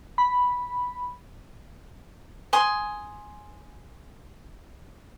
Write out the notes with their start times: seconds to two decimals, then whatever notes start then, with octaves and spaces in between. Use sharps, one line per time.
0.18 B5
2.53 G#5 C6 D#6